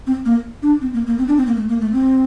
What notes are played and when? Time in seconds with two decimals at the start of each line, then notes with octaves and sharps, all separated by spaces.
0.07 C4
0.25 A#3
0.63 D4
0.81 C4
0.94 A#3
1.06 A#3
1.19 C4
1.28 D4
1.37 C4
1.47 A#3
1.56 A3
1.68 A#3
1.81 A3
1.93 C4